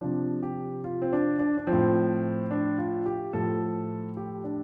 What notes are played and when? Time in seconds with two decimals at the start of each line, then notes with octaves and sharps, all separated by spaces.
0.01 C3 F3 D4
0.43 G4
0.84 F4
1.02 C4
1.13 D4
1.39 D4
1.57 D4
1.67 F3 C4
1.72 A2
2.51 D4
2.78 F4
3.06 G4
3.33 A2 F3 A4
4.17 G4
4.44 D4